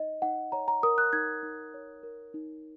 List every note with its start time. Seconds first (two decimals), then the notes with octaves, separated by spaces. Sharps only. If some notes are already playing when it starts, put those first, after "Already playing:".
Already playing: D#4 D#5
0.22 D#4 F#5
0.52 C#5 A#5
0.68 A#5
0.83 A#4 D#6
0.98 F#6
1.13 D#4 G#6
1.43 D#4
1.74 C#5
2.03 A#4
2.34 D#4